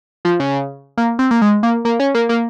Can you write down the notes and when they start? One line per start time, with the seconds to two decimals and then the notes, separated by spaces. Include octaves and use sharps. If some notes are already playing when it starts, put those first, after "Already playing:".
0.25 F3
0.40 C#3
0.97 A#3
1.19 C4
1.31 A#3
1.42 G#3
1.63 A#3
1.85 A#3
2.00 C#4
2.15 A#3
2.29 A#3